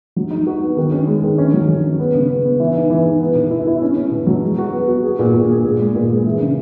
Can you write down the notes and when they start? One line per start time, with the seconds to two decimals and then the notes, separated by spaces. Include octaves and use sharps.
0.16 F#3
0.31 D#4
0.46 F#4
0.61 B3
0.77 D#3
0.92 C#4
1.07 G#3
1.23 D#3
1.38 C#4
1.53 F#3
1.68 F#3
1.84 C#4
1.99 B3
2.15 C#3
2.30 B3
2.45 B3
2.60 E3
2.75 D#4
2.90 E3
3.05 D#4
3.20 B3
3.35 B2
3.51 E4
3.67 E4
3.82 C#4
3.97 C#4
4.11 B2
4.27 F#3
4.43 G#3
4.58 F#4
4.72 B3
4.88 F#4
5.03 G#4
5.19 A#2
5.34 A#2
5.49 G#4
5.65 A#2
5.80 G#3
5.95 A#2
6.11 G#3
6.26 E3
6.41 C#3